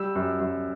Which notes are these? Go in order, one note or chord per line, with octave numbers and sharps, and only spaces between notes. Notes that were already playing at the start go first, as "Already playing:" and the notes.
Already playing: G3 E6
F#2
F#2